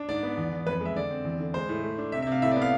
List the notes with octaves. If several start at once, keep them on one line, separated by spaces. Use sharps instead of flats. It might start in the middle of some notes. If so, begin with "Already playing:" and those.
Already playing: D4
G#2 D5
B3
E2
E2
F2 B4
G#3 E5
D3 D5
C4
E2
D3
G#3 C5
A2
A3
D4
C3 E5
E5
C3 F5
A2 E5
D5
B3
F5